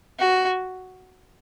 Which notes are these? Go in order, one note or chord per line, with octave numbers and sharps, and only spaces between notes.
F#4